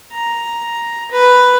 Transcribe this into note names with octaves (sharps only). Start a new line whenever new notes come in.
A#5
B4